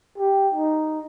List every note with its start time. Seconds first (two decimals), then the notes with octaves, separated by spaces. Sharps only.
0.18 G4
0.54 D#4